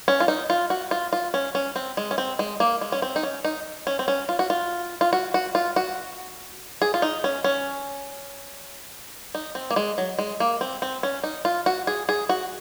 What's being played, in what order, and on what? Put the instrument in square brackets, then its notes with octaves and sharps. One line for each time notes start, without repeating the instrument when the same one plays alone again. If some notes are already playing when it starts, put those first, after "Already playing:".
[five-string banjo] C#4
F4
D#4
F4
F#4
F4
F4
C#4
C#4
C4
G#3
C#4
C4
G#3
A#3
G#3
C#4
C4
D#4
C#4
D#4
C#4
C4
C#4
F4
F#4
F4
F4
F#4
F#4
F4
F#4
G#4
F4
D#4
C#4
C#4
D#4
C4
A#3
G#3
F#3
G#3
A#3
C4
C4
C#4
D#4
F4
F#4
G#4
G#4
F#4